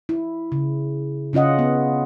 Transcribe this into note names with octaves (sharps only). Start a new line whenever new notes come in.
E4
C#3
C#3 C#4 F4 D#5 F#5
B3